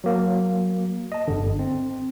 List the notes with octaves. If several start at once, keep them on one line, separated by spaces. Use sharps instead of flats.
F#3 A#3
D#5 A5
G1 D3
C4